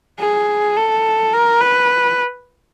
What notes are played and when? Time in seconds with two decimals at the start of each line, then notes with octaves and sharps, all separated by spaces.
0.19 G#4
0.77 A4
1.33 A#4
1.61 B4